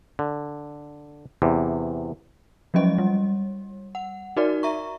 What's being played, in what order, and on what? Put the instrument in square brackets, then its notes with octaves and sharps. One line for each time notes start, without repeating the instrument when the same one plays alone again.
[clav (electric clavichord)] D3
E2 C3
[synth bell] F3 F#3 G#3 C#4 D#5
G3
F#5
D#4 F#4 A#4 D5
E5 A#5 C#6